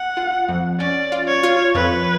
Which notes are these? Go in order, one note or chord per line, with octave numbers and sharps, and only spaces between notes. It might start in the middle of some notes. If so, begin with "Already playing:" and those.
Already playing: F#5
F4
F2
C#4 D5
F4
C#5
F4
F2 B4